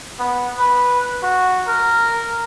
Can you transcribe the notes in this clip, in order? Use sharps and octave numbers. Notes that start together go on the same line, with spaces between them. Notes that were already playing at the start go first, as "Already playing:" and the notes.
B3
B4
F#4
A#4